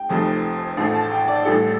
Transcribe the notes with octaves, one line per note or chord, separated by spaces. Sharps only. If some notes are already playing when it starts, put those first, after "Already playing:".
Already playing: G5
F1 F2 C3 F3 A3
A1 A2 F3 A3
A5
G5
D5
A1 A2 G3 A4